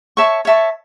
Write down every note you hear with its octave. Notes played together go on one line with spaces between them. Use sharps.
C#5 E5 A5 C#6
C#5 E5 A5 C#6